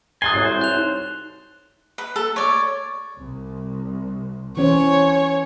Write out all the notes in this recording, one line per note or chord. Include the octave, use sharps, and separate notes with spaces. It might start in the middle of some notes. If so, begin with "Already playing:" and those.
B4 G#5 D#6 F#6 G6 A6 C7 G7
C2 F#4 A4 C#5
C5
F#6 F7
D#4
B4
A4
C#5 D5
C2
E3 C#4 C5 C#5